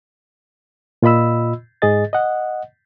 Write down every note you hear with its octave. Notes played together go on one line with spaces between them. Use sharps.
A#2 F4 D#5 B5 E6
G#2 G#4 D#5 A6
D#5 F#5